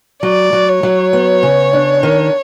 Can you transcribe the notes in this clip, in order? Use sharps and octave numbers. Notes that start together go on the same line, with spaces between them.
F#3 D5
F#3
C#5
F#3
B3
C#3
D4
D#3